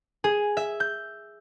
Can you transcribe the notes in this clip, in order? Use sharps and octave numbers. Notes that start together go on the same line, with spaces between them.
G#4
E5
G6